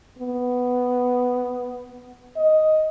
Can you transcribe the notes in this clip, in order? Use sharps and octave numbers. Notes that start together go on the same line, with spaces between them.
B3
D#5